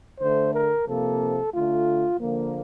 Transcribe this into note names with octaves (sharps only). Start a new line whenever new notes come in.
D3 A3 C5
A#4
C3 F3 A#3 A4
D3 A3 F4
D3 F3 A#3